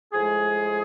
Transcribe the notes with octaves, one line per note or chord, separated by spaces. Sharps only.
A2 F3 G#3 G#4